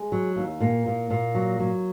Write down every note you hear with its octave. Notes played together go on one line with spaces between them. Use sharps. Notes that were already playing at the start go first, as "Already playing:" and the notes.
Already playing: G#3
F#3
D#2
A#2 A#3
A#2
A#2
F#3
F#3